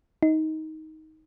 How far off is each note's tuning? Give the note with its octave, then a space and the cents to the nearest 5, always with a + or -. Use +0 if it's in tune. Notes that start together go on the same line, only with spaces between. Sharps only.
D#4 +15